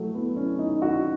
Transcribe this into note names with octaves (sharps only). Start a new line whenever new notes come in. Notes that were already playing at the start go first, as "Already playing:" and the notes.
Already playing: F#3 A3
B3
C#4
D#4
F#4